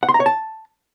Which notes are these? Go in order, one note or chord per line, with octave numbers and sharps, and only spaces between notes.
F#5
C6
A#5
C#5
A5